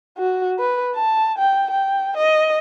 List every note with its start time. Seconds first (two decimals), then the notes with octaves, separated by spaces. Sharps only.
0.18 F#4
0.59 B4
0.95 A5
1.38 G5
1.70 G5
2.17 D#5